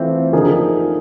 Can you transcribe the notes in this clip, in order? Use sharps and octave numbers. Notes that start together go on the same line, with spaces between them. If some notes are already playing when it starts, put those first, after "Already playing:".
Already playing: E3 A3 C4 F4 A4
D3 F3 A#3 D#4 G#4